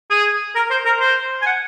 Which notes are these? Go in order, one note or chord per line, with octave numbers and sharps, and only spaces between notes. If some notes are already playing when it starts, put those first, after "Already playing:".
G#4
A#4
C5
A#4
C5
G#5
F#5